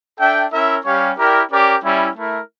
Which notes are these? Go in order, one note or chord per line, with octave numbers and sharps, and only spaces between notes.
D4 A4 E5 G5
C#4 E4 A#4 E5
G3 C#4 G4 C#5 F5
E4 G4 A#4 D5 G5
C#4 G4 A#4 D5 G5
G3 C#4 E4
A3 E4 A#4